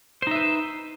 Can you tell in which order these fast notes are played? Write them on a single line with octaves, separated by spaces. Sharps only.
C5 D#4 E5 B4